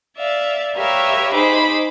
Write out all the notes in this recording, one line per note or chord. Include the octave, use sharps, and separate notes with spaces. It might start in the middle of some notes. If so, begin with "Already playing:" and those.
D5 E5 F5
G4 A#4 B4 C#5 E5 F5
D#4 G#4 C5 B5 D6